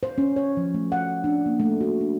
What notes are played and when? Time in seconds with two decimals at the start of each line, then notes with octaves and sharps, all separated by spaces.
0.03 C5
0.18 C#4
0.36 C#5
0.57 F3
0.74 A3
0.92 F#5
1.24 D4
1.46 A#3
1.60 A3
1.81 F#4
2.01 D4